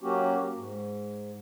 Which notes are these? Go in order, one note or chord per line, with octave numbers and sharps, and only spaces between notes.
F#3 A#3 C#4 F#4 G4
G#2